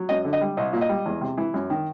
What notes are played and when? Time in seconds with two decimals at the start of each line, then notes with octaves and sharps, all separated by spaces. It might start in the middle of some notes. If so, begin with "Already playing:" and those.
Already playing: F#3
0.09 F#2 D#5
0.25 D3
0.33 D#5
0.41 G3
0.57 C2 D#5
0.73 A#2
0.81 D#5
0.89 G3
1.06 E2
1.21 C3
1.37 E3
1.54 F#2
1.70 D#3